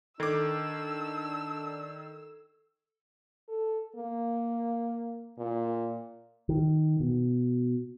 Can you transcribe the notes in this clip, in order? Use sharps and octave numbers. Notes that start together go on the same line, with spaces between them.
D#3 D4 A4 D6 E6 G#6 C7
A4
A#3
A#2
D#3
B2